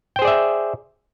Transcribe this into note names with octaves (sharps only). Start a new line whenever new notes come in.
G#4 C5 D5 E5 G5